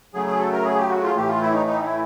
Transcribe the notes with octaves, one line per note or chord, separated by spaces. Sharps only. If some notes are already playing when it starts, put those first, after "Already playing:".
C#3 F#3 A3 G#4
G#4
A4
A#4
G#4
G4
F#4
F4
A2 E3 A3 G4
F4
E4
D#4
D#4
E4